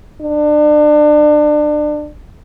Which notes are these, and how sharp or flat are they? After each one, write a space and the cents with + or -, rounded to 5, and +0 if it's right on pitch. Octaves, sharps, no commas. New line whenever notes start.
D4 +30